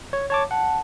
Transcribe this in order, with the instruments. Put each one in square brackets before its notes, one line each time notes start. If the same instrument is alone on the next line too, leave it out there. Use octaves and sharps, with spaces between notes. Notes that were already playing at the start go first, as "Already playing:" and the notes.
[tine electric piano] C#5
C#5 A5 D6
[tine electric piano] F#5 [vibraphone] A5